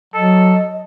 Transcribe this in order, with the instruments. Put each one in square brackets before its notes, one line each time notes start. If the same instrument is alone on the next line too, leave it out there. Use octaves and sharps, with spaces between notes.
[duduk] F#3 [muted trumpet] A4 [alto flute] D#5